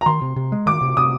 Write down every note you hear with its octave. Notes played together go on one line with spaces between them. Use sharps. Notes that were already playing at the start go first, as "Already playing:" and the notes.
A#5
D#3 C6
C3
C3
G#3
D#3 D6
C3
C3 D#6